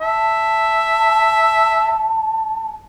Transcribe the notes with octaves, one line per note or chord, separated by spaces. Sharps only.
E5 A5